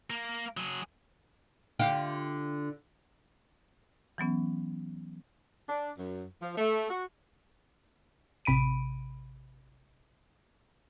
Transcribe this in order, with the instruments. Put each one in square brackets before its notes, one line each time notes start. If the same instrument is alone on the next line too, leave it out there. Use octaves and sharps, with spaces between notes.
[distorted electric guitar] A#3
F#3 G#4
[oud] D3 F4 G4
[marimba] E3 F#3 B3 C#4
[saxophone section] D4
F#2
F3
A3
F#4
[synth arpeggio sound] A1 C3 B5 D7 D#7